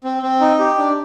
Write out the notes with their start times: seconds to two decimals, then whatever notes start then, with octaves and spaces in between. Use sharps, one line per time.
0.04 C4
0.23 C4
0.41 D#4
0.60 G4
0.78 D4